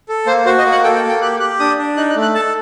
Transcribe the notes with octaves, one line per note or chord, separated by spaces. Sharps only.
A4
A#3 C5
F#4 C5
D#5
A#3
F#5
A4 G5
G5
A#3
G5
G4 F#6
G4 F#6
D4 D#6
D4
D#4 F#6
F#6
A3
F#6
A4 A5